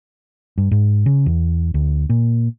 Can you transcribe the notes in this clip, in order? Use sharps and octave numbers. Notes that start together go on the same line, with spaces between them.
G2
G#2
C#3
E2
D2
A#2